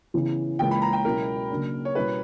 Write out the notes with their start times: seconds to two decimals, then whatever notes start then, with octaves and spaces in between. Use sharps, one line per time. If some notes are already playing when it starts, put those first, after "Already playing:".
0.14 C#3 E3 B3
0.59 C#2 C#3 E3 A#3 G5
0.71 B5
0.82 A#5
0.93 G5
1.05 C#2 B2 F#3 C#4 E4 A#4
1.51 C#3 F#3 A#3 D4
1.85 C#5
1.95 B2 G3 C#4 E4 B4